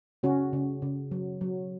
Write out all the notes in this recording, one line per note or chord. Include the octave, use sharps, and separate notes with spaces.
C#3 C#4 F#4
C#3
C#3
F#3
F#3